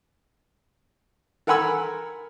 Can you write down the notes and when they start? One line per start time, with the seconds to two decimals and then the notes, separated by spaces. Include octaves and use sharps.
1.47 A4 A#4 F#5 G#5 B5 E6